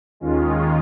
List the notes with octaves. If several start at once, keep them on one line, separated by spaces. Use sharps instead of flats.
D#2 D#3 G#3 C#4 F4